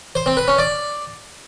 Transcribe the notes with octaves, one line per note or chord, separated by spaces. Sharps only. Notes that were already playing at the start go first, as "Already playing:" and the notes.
C5
C4
B4
C#4
D5